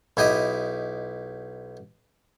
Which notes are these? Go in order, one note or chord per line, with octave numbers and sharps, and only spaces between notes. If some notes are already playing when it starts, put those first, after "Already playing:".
B1 E4 G4 D#5